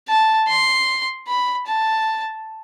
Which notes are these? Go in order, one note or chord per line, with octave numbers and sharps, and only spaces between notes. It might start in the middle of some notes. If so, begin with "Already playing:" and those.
A5
C6
B5
A5